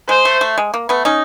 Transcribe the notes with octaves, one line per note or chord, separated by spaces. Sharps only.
G#3 C5
A3
A3
G#3
A#3
A3 B3
C#4 D#4